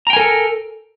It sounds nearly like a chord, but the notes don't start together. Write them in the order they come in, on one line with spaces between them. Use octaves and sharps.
A#5 G5 G#5 A#4 A4